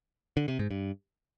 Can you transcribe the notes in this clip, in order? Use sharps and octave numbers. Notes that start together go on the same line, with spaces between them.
D3
C3
G#2
G2